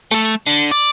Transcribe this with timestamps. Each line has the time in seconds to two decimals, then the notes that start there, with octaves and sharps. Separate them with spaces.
0.11 A3 A4
0.47 D3
0.71 D5